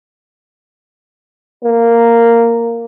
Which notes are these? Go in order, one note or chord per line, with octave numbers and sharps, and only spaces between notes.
A#3